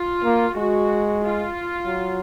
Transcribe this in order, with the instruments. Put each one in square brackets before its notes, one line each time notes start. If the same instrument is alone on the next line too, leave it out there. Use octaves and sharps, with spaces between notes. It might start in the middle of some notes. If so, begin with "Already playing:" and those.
Already playing: [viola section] F4
[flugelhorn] A#3
[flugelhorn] G#3 [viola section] F#4
[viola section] F4
[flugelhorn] F#3